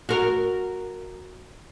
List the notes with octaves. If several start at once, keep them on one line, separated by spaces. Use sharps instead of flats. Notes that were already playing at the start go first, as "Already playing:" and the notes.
F#4 A#4